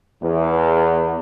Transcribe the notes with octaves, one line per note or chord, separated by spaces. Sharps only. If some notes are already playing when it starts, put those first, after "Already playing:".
E2